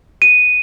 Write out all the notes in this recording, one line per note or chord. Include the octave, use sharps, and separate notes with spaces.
D#7